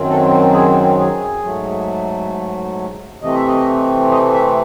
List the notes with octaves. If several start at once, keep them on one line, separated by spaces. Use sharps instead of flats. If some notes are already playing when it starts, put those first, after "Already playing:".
Already playing: F#2 D#3 F#3 C4
A4
G#4
G#4
G#2 F#3 A3
C3 E3 A3 C4 D#5
E5
D#5
D#5
E5